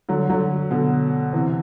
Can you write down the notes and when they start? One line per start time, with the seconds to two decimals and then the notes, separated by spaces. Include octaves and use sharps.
0.09 D3 F#3
0.29 D3 F#3
0.71 B2 D3
1.33 C3 E3